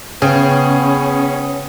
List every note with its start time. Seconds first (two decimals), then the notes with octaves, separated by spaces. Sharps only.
0.22 C#3 B3 C#4 G#4 G5